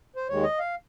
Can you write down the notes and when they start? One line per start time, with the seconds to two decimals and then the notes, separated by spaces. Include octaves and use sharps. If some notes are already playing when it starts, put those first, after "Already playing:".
0.16 C5
0.28 D#2 D#3 G#3 C#5
0.43 D#5
0.59 F5